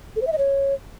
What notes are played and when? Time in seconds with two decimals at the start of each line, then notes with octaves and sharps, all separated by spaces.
0.16 A4
0.21 C5
0.27 E5
0.32 D#5
0.38 C#5